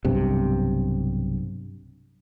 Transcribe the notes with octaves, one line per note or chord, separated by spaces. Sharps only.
B1 G2 C3